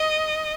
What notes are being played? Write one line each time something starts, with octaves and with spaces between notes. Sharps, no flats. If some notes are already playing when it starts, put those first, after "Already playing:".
Already playing: D#5